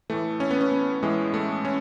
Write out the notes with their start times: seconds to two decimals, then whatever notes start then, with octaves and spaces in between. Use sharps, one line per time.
0.10 A2 E3 A3
0.40 C#4
0.51 B3
0.61 C#4
0.72 B3
1.03 A2 E3 G#3
1.34 A3
1.65 C#4